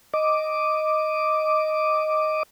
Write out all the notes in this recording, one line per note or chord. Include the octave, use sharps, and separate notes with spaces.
D#5 D6